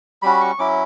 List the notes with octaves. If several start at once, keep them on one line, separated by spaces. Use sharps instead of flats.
G3 C#4 F#4 B5
C#6
F#3 C#4 E4 D6